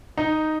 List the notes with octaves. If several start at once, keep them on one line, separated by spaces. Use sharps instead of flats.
D#4